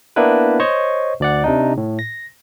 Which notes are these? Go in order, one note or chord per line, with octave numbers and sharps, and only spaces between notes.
A#3 B3 D4 E4 A#4 B4
C5 C#5 D#5 C#6
D2 D5 F#5
C3 D4 D#4
A2
A#6